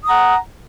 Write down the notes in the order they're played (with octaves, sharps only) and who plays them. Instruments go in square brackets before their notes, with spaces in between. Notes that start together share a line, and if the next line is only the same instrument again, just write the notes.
[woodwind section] D#6
A#5
F#5